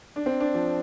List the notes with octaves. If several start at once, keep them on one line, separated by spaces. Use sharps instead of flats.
D4
C4
D4
F3